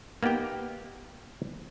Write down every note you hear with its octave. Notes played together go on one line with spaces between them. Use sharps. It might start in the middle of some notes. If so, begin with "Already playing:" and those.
A#3 B3 D#4 G4 G5